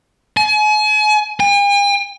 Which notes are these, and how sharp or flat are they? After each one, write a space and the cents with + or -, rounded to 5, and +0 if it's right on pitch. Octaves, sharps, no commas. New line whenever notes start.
G#5 +40
G#5 -45